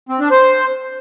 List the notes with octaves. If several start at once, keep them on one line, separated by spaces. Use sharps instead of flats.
C4
D4
C5